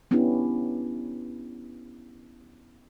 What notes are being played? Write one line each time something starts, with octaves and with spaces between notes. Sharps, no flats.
B3 C#4 D4 E4 G4